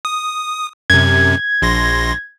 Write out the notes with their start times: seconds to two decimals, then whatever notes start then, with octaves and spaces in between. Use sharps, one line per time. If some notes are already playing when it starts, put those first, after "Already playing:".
0.05 D#6
0.90 F#2 C3 G#6
1.62 A#1 C6 A#6